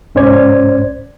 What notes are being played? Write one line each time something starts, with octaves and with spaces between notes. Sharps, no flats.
C2 G#2 C#4 C5 D5 G#6